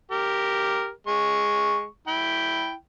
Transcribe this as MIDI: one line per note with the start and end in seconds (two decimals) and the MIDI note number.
0.11 0.90 67
0.11 0.90 70
1.07 1.85 56
1.07 1.85 85
2.08 2.73 64
2.08 2.73 79